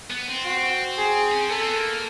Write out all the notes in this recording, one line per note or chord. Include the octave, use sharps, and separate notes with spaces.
B3
C4
F#4
G#4
C#4
C4
B3 A4
C4
B3
A#3